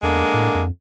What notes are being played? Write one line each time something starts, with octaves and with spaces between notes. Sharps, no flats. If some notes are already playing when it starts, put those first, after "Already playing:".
E2 D3 G#3 A#3
A2
F2